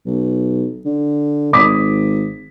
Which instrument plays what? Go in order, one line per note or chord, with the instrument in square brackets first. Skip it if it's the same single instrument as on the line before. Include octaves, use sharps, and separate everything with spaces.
[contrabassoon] B1
D3
[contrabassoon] G#1 [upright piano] D6 D#6 B6